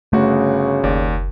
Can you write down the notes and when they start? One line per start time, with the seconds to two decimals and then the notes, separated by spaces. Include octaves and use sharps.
0.13 G1 C#3 A3 F#4
0.84 F#1 D#2 D5